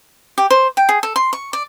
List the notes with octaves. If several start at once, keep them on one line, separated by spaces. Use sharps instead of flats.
G4
C5
G5
G#4
A4
C6
C#6
D5